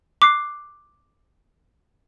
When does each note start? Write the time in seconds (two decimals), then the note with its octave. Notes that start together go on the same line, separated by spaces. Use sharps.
0.22 D6 F#6 C7